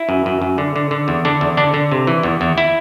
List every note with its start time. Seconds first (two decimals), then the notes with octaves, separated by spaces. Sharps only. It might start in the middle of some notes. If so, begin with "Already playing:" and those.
Already playing: E4
0.09 F#2
0.26 F#2
0.42 F#2
0.58 D3
0.76 D3
0.91 D3
1.08 E2
1.25 D3 D4
1.41 E2
1.57 D3 D4
1.74 D3
1.91 C3
2.07 E3
2.23 E2
2.41 E2
2.58 E4